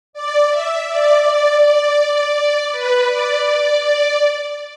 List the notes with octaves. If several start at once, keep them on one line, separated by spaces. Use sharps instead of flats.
D5
E5
D5
D5
B4
D5
D5
D5